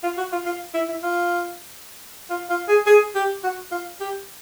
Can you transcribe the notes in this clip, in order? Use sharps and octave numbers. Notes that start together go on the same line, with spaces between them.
F4
F#4
F4
F4
E4
E4
F4
F4
F4
G#4
G#4
G4
F#4
F4
G4